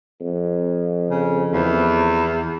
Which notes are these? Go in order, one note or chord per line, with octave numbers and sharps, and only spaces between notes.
F2
C#3
E2